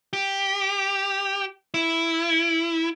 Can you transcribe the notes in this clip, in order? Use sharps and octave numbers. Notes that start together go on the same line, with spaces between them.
G4
E4